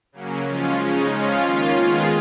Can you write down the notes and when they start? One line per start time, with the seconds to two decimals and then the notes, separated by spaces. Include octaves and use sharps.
0.12 C#3 F#3 A#3 C#4
0.46 F3 G#3 C#4 F4
0.79 C#3 G#3 C#4 D#4
1.12 F3 G#3 C#4 F4
1.45 D#3 A#3 C#4
1.78 D#3 G#3 B3 F4 G#4